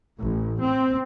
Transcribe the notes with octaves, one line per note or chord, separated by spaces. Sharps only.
A1
C4